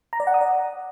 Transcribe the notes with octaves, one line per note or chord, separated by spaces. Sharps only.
A#5
D5
F#5
D#6
D5